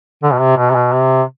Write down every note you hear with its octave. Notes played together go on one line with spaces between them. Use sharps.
D3
B2
C3
B2
C3
B2
C3